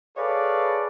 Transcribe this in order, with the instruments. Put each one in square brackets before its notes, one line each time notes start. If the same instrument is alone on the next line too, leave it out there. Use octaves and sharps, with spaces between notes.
[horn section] G#4 A4 B4 C#5 D5 F5